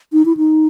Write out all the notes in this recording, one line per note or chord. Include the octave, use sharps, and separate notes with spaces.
D#4
E4
D#4